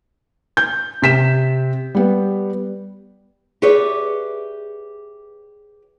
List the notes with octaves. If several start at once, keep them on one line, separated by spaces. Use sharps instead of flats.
G6
C3 B6 E7
G3 B3
G4 G#4 B4 C#5 D5 E5